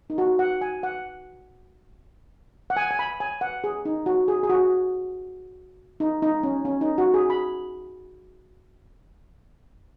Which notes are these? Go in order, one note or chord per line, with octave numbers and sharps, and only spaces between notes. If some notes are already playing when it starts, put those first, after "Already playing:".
D#4
F#4
F#5
G#5
F#5
F#5
G#5
G#5
B5
G#5
F#5
G#4
D#4
F#4
G#4
G#4
F#4
D#4
D#4
C#4
C#4
D#4
F#4
G#4
B5